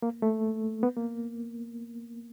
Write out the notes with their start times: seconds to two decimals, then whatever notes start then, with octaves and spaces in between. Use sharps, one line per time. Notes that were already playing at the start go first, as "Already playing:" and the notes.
0.02 A#3
0.22 A3
0.83 B3
0.97 A#3